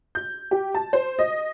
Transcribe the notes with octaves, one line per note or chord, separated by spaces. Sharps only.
G6
G4
A5
C5
D#5